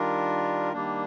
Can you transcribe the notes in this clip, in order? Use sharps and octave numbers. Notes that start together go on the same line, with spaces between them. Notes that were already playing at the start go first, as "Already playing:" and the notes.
Already playing: D#3 G3 D4 F4 A#4
D#3 G3 A#3 D4